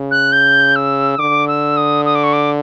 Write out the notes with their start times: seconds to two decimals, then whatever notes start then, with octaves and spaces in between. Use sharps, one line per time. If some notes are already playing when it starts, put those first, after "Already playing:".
Already playing: C#3
0.11 F#6
0.32 G6
0.76 E6
1.19 D3 D6
1.48 E6
1.77 D#6
2.05 D#6
2.15 D6
2.23 C#6
2.33 D6